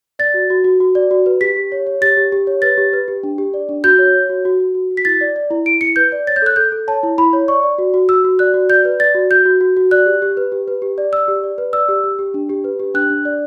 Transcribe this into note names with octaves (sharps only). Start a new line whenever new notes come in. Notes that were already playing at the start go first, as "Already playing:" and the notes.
D5 A6
F#4
F#4
F#4
F#4
D5
F#4
B4
G4 B6
G4
C#5
C#5
G4 A6
G4
G4
C#5
B4 A6
G4
B4
G4
D4
G4
D5
D4
F#4 G6
C#5
C#5
F#4
F#4
F#4
F#4
F#4
B6
E4 A6
D5
D5
E4
E4 D7
E4 C#7
B4 G6
D5
C#5 A6
G6
A4 F#6
A4 G6
A4
C#5 A5
E4
E4 B5
C#5
D5 C#6
D5
F#4
F#4
F#4 E6
F#4
D5 F#6
F#4
D5 G6
B4
D5 A6
F#4
F#4 G6
F#4
F#4
F#4
D5 F#6
G4
G4
B4
G4
B4
G4
D5
D5 E6
G4
D5
B4
D5 E6
G4
G4
G4
D4
G4
B4
G4
D4 F#6
D4
D5